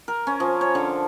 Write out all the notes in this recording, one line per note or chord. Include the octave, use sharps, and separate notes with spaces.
A#4
C#4
F3
C#5
D3